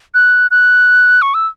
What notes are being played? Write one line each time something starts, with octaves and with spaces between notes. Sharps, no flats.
F#6
F#6
C#6
E6